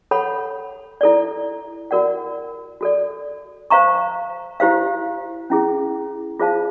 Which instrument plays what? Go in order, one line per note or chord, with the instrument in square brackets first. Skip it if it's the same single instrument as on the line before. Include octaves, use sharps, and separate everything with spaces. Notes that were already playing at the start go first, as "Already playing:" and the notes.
[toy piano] A4 C#5 F#5 B5
E4 A4 D5
F#4 A#4 D5 F#5
F#4 A4 D5
C5 F5 A#5 C#6
E4 G4 C5 F5
C#4 E4 G#4
F4 G#4 C5 F5 A5